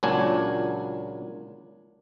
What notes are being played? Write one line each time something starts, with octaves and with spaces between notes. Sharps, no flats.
C#2 A#2 F#3 D4 G#5